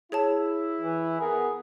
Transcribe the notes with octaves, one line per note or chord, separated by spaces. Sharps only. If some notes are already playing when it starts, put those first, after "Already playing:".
E4 G#4 C#5 A5
E3
B3 G#4 A#4